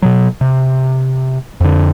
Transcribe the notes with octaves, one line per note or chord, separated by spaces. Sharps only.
B2 F#3
C3
F2 D3